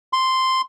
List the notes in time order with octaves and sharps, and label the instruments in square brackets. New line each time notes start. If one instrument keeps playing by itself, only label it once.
[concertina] C6